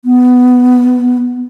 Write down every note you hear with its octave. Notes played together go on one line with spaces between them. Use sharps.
B3